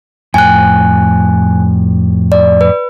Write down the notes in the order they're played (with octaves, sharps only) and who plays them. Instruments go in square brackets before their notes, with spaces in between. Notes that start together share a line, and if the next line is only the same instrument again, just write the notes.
[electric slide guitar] F2 A2 G5 [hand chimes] G#5 F#6
[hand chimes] D5
B4